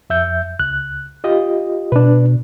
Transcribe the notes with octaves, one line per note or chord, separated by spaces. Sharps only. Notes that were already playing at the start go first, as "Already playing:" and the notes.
F2 E5 G6
C#2 F#6
F4 G4 D#5
B2 D4 B4